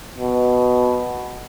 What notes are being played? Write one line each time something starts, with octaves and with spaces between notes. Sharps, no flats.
B2